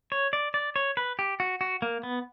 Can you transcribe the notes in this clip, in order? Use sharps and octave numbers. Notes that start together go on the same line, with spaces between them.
C#5
D5
D5
C#5
B4
G4
F#4
F#4
A#3
B3